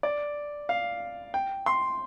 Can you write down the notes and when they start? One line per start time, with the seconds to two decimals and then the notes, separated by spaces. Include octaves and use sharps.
0.03 D5
0.69 F5
1.34 G5
1.66 C6